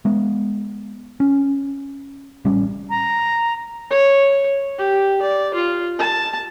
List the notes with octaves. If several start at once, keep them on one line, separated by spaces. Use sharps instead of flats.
G#3 B3
C#4
A1 G3 C#4
A#5
C#5
G4
D5
F4
A5